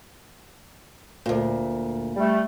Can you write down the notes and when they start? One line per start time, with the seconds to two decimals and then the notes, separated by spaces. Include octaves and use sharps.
1.26 D2 A#2
2.16 G3 A3